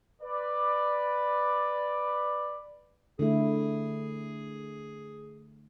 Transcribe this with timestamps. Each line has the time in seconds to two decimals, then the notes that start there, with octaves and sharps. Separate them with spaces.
0.22 B4 D5
3.19 D3 A3 E4 G#4